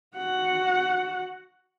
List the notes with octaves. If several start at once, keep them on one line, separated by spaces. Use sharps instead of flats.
F#4 F#5